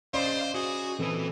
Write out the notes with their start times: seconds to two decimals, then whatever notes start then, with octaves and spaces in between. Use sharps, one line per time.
0.14 C#4 C5 D5 D#5 F5 B5
0.54 F#4 G#4
0.99 A#2 E3 C4 A4 B4